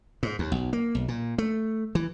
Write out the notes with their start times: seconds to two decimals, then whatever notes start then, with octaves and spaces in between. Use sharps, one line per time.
0.23 G#2
0.39 D#2
0.52 B1
0.73 A#3
0.95 B1
1.08 A#2
1.38 A3
1.95 E3